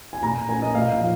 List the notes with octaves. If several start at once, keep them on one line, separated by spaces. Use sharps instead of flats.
G#5
A#2 A#5
A#3 C#4 G#5
D#5
A#2 F5
F5
F3